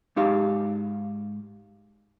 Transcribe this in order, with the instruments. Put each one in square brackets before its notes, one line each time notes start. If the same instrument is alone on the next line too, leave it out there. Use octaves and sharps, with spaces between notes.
[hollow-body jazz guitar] G#2 D#4 G4 F5